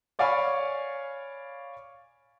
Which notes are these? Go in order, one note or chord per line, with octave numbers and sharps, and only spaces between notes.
C#5 D5 F5 G#5 B5 C#6